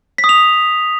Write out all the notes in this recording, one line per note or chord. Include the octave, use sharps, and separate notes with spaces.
B6
D#6
F7